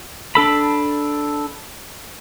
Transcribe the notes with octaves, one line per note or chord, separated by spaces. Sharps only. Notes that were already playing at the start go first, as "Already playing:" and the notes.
D4 A4 B5